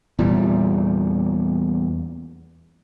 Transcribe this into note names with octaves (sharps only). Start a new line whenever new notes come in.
E2 A#2 G3